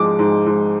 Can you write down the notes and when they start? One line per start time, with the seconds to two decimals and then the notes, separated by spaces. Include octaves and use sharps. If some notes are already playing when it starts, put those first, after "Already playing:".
Already playing: G#2 F3 G#3 D6
0.19 G#2
0.46 G#2